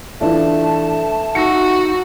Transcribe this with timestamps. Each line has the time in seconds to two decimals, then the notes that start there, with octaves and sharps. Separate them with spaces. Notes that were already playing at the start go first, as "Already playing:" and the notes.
0.21 E3 A3 D4 F4 A5
1.35 D#4 F#4 E6 A#6 C#7